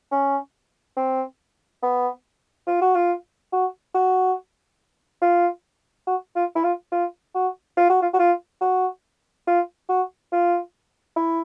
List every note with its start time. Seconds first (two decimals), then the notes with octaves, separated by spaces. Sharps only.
0.12 C#4
0.96 C4
1.83 B3
2.67 F4
2.81 F#4
2.95 F4
3.53 F#4
3.94 F#4
5.21 F4
6.07 F#4
6.36 F4
6.56 E4
6.64 F4
6.92 F4
7.35 F#4
7.77 F4
7.90 F#4
8.02 F4
8.13 F#4
8.19 F4
8.61 F#4
9.47 F4
9.89 F#4
10.32 F4
11.16 E4